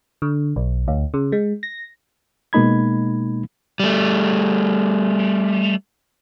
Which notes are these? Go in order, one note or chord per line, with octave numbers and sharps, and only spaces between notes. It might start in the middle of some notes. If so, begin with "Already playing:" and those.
D3
B1
D2
C#3
G#3
A#6
B2 G#3 A#3 D#4 B5 G#6
G3 A3